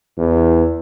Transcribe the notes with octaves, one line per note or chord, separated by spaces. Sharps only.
E2